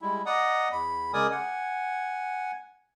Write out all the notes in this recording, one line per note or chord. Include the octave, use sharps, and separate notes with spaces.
G3 G#3 E4
D5 D#5 F#5 A#5 D#6
E2 B5
C#3 G#3 A#4 D5 G#5 D#6
F#5 G#5